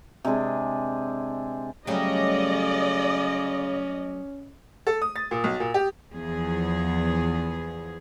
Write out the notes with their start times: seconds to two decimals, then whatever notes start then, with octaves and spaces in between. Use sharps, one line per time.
0.24 C3 G#3 D4 G#4
1.87 C#3 F#3 G3 A3 C#4 D5 D#5
4.87 A4
5.02 D#6
5.16 A6
5.31 A#2
5.44 B1
5.60 A#2
5.74 G4
6.13 E2 F3 B3 G#4